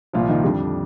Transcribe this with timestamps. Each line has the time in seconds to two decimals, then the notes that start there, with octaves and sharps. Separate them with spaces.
0.13 C2 A#2 F3 F4
0.29 D#3 D#4
0.44 F2 D3 G3 D4